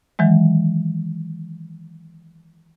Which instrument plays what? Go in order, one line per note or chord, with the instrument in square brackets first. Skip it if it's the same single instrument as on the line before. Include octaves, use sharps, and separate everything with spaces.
[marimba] D#3 E3 F#3 G#3